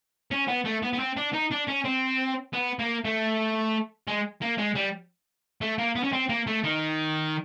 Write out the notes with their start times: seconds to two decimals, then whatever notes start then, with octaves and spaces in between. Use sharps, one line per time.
0.31 C#4
0.48 B3
0.65 A3
0.83 B3
0.93 B3
0.99 C4
1.17 D4
1.33 D#4
1.52 D4
1.68 C#4
1.85 C4
2.53 B3
2.79 A#3
3.05 A3
4.07 G#3
4.42 A#3
4.58 G#3
4.76 G3
5.61 A3
5.78 A#3
5.96 B3
6.03 C#4
6.13 C4
6.29 A#3
6.47 A3
6.64 D#3